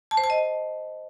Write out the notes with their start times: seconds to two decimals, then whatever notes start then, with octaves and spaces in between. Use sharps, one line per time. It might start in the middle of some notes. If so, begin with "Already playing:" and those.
0.11 A5
0.17 C5
0.24 A5
0.30 D#5